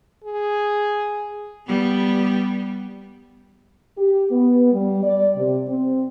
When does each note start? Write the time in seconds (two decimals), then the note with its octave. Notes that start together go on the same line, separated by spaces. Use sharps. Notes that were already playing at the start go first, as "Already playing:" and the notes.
0.24 G#4
1.66 G3 B3
3.98 G4
4.31 B3
4.72 G3
5.04 D5
5.36 C3
5.69 C4